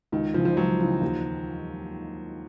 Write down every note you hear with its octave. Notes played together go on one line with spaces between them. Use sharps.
C#2 D#3
C#3 E3 F3
F3
C#2 F#3
C#3 E3
D#2